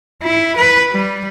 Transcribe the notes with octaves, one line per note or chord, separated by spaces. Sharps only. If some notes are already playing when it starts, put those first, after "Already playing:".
E4
B4
G3